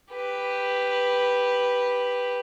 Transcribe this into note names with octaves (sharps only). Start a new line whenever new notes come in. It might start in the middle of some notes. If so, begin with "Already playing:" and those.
G4 B4